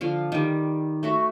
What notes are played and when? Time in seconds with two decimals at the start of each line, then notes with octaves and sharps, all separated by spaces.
0.01 D3 F3 F5
0.32 D#3 G3
1.03 A3 F#4 E5